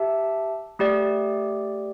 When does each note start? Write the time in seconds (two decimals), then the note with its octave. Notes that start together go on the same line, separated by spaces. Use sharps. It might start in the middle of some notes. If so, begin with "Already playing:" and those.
Already playing: G4 E5 A5
0.79 A3 G4 D5